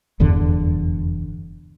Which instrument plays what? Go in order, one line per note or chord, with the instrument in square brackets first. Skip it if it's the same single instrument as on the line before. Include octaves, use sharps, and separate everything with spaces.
[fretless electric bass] F1 E2 G2 D3